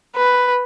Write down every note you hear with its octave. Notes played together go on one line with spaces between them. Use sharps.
B4